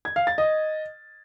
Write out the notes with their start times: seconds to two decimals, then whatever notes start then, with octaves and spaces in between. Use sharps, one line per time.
0.05 G#6
0.16 F5
0.27 A6
0.38 D#5